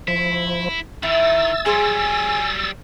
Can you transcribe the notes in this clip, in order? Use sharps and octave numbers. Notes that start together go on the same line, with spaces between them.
F3 E4
D#3 E4 E6 A6
F#3 G3 G#4 C5 G#5